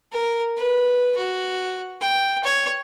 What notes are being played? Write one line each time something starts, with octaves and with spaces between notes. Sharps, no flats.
A#4
B4
F#4
G5
C#5